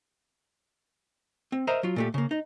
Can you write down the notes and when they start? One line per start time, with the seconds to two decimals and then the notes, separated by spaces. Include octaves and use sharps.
1.52 C4
1.67 A#4 C5 D#5 E5 A#5
1.83 F#3 F4
1.96 A#2 A3 G4
2.14 C#3 A#3
2.31 D#4